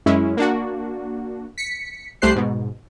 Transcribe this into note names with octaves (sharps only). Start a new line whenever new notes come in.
F#2 G#3 C#4 E4
A#3 D4 F#4
B6 C#7
C2 A3 G4 C5 F#6 C7
G#2 B2